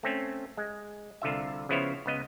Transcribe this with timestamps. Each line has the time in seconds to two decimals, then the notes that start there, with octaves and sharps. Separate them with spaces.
0.03 A3 C4 C#4
0.57 G#3
1.22 C2 D3 F4 E5
1.69 C#3 F3 B3 E4 C5 C#5
2.06 C#2 B3 D#5